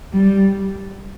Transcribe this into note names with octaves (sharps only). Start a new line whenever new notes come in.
G3